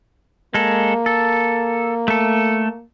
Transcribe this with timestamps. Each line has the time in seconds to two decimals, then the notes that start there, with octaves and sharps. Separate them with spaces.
0.54 G#3 A#3 A4
1.06 A4
2.08 A3 A4